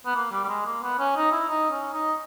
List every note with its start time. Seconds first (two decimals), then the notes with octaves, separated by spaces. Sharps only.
0.06 B3
0.15 A#3
0.31 G3
0.44 G3
0.48 G#3
0.66 A#3
0.82 B3
0.99 C#4
1.16 D#4
1.32 E4
1.49 D#4
1.71 C#4
1.93 D#4